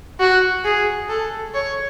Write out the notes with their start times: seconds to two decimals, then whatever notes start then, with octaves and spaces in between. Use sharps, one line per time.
0.20 F#4
0.64 G#4
1.09 A4
1.54 C#5